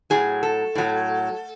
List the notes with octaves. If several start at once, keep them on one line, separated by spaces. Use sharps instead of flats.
A2 F#3 G#4
A4
A2 F#3